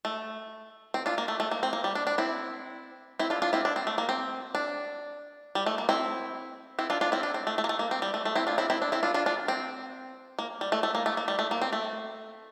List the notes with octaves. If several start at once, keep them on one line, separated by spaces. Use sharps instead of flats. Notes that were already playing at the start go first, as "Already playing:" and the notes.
A3
C4
D4 F4
A#3
A3
A3
A#3
C4
A#3
G3
D4
D4
C4 E4
C4 E4
D4 F4
D4 F4
C4 E4
D4
C4
A3
A#3
C4
D4
G3
A3
A#3
C4 E4
C4 E4
D4 F4
D4 F4
C4 E4
D4
C4
A3
A3
A#3
A3
A#3
C4
G3
A3
A3
C4 E4
D4 F4
C4 E4
C4 E4
D4
C4 E4
D4 F4
D4 F4
D4 F4
C4
A#3
G3
A3
A3
A#3
A3
A#3
G3
A3
A#3
C4
A3